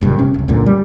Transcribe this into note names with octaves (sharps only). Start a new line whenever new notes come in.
F#1 G2 A#2 C#3
C3 C#4
D#1 C2
C#2 F#2 A#2 D3
G3